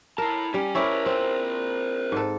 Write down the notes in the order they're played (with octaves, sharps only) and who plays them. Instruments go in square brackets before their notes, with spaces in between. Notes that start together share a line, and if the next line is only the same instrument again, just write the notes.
[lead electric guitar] E4 A5 [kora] A#4
[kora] G3 [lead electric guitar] C#4
[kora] C#4 E4 D5 [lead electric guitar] A#4 C5
[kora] C4
G#2 A4